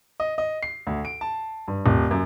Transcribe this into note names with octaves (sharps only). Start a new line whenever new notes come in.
D#5
D#5
C7
D2
D7
A5
G2
D#1
F#2